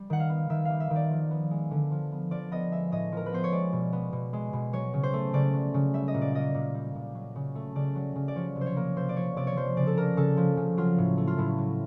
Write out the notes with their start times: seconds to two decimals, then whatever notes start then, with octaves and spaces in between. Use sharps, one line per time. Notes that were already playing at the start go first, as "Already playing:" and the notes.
Already playing: G3
0.10 D#3 F#5
0.20 F5
0.30 B3
0.50 D#3 E5
0.65 G3 F5
0.80 E5
0.90 D#3
0.96 D5
1.10 F3
1.31 B3
1.51 G#3
1.71 D3
1.91 F3
2.12 B3
2.31 F3 D5
2.51 B3 D#5
2.72 G#3 E5
2.92 A2 D#5
3.12 F3 A#4
3.26 B4
3.32 B3 C5
3.44 C#5
3.52 G#3 D5
3.73 B2
3.93 B3
4.12 B2
4.33 G#3
4.53 B2
4.73 F#3 C#5
4.93 C#3
5.03 C5
5.13 A3
5.33 C#3 D5
5.54 F#3
5.74 C#3
5.94 G3 E5
6.08 D#5
6.14 A#2
6.21 D5
6.34 A#3 D#5
6.55 A#2
6.74 G3
6.95 A#2
7.15 F#3
7.35 C#3
7.55 A3
7.75 C#3 D5
7.95 F#3
8.16 C#3
8.28 D5
8.36 F3 C#5
8.56 C3
8.61 C5
8.66 C#5
8.76 A#3
8.96 C3 C5
9.09 D5
9.16 F3 C#5
9.37 C3 D5
9.47 C#5
9.56 F3 C5
9.77 C#3 D5
9.87 A4
9.97 A#3 A#4
10.17 C#3 A4
10.37 F3
10.57 C#3
10.77 F#3 F4
10.98 A2
11.17 A3
11.27 F4
11.38 A2 E4
11.58 F#3